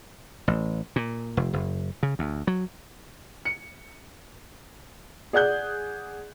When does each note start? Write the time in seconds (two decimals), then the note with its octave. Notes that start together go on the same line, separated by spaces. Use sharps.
0.48 A1
0.96 A#2
1.37 F1
1.53 F#1
2.03 C#3
2.19 D2
2.47 F#3
3.45 C#7
5.33 G#4 D5 F#5 F#6 G6